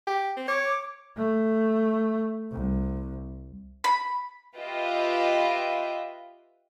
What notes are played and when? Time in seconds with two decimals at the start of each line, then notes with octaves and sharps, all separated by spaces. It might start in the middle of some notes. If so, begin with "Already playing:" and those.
0.07 G4
0.37 C4
0.48 C#5 D6
1.18 A3
2.52 C2
3.84 B5
4.57 F4 G4 B4 D#5 E5 G5